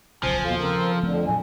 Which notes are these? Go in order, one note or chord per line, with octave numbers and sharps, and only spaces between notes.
D1 B1 C#3 F3 C5 G#5
D#2 B2 F4 A4
C#3 C4 A#4
F2 D3 F3 A3 C4
A#2 F#3 G#5